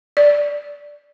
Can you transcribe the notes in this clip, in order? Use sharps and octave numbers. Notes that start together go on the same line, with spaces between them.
D5